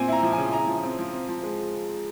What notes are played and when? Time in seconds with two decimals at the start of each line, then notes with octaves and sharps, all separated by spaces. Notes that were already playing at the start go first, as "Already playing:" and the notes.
Already playing: A#2 C4 G#5
0.08 E4 A#5
0.23 F3
0.33 G#5
0.38 C#3
0.53 E4 A#5
0.68 F3
0.83 C4
0.99 F3
1.13 C4
1.28 F3
1.43 G#3